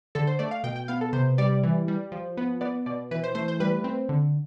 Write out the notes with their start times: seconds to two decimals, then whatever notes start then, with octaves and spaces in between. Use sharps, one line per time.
0.15 D3 A4
0.27 C5
0.39 A3 D5
0.51 F5
0.63 B2 G5
0.76 G5
0.88 B3 F5
1.01 A4
1.13 C3 C5
1.38 G3 D5
1.63 E3
1.88 G3
2.12 F3
2.37 B3
2.61 B3 D5
2.86 B2 D5
3.11 E3 B4
3.24 C5
3.35 A3 C5
3.48 C5
3.60 G3 B4
3.84 C4
4.09 D3